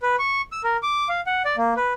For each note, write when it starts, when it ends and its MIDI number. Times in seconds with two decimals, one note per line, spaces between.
0.02 0.16 71
0.19 0.42 85
0.52 0.62 88
0.64 0.77 70
0.83 1.09 86
1.09 1.21 77
1.27 1.42 78
1.45 1.56 74
1.57 1.74 58
1.77 1.93 71